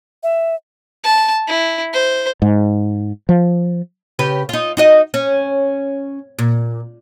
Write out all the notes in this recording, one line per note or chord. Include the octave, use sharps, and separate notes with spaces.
E5
A5
E4
C5
G#2
F3
C#3 G4 B4
D#4 F4
D#4 F#4 D#5
C#4
A#2